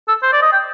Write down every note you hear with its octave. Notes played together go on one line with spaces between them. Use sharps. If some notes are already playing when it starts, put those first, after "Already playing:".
A4
C5
D5
D#5
G5